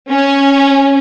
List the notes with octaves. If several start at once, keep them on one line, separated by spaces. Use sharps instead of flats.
C#4